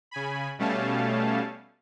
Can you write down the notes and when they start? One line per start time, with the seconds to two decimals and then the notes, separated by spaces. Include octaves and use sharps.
0.11 C#3 G#5 B5
0.59 B2 G3 A3 C#4 F5 A5